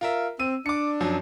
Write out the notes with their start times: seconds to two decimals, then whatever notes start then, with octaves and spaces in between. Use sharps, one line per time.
0.01 F4 A#4 E5
0.39 C4 E6 D#7
0.66 D4 D6 C#7
1.01 F#2 F3 F#3